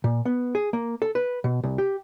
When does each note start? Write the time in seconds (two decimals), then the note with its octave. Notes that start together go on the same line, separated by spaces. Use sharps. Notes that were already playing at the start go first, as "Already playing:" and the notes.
0.04 A#2
0.25 B3
0.55 G#4
0.73 A#3
1.02 A4
1.15 B4
1.44 B2
1.64 C2
1.78 G4